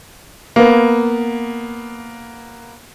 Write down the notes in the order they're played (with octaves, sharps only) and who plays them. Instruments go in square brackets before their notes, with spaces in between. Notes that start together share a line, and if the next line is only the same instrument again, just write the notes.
[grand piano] A#3 B3